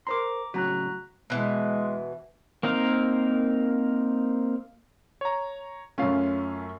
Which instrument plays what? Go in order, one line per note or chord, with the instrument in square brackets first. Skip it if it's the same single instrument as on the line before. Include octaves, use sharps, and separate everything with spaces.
[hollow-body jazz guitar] A#4 C5 C6 [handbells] A#5 D6
[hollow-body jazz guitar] A2 C#3 F#3 [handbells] F#4 A#5 F#6
[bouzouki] B2 E3 [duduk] G#3
[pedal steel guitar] A#3 C4 D#4 A#4 F5
[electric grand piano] C#5 A#5
[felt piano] F#2 C#4 [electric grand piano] A3 F4 F5